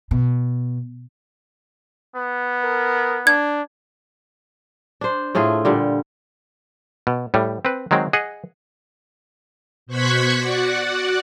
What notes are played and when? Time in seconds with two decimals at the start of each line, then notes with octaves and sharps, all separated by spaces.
0.11 B2
2.16 B3
2.64 A#4
3.27 D4 G#6
5.01 D4 C5
5.35 A2 A3 F4 G#4
5.65 A#2 D3 G3
7.07 B2
7.34 A2 G3
7.65 C4 B4
7.91 D#3 F#3 G#3 C4
8.13 G#4 D#5 F#5
9.86 B2 C5 C#6 F#6 G#6 B6
10.36 F#4 D5 F#5